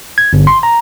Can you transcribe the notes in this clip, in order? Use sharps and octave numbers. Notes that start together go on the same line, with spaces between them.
G#6
G1
C6
A#5